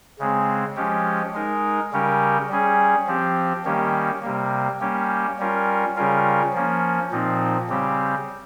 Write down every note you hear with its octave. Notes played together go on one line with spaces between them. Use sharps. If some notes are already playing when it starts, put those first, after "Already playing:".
C#3 G#3 C4
F3 G#3 C#4 G4
G#3 D#4 A#4
C#3 G3 C#4 G4 A#4
G3 C#4 G#4
F3 C4 G4
D#3 G3 A#3 C#4 G4
C3 G3 A#3
G3 A#3 C#4 G4
G3 C#4 F4 A#4
C#3 G3 C#4 F4 A#4
F3 A#3 C#4
A#2 F3 C4 D#4
C#3 G3 C4 G4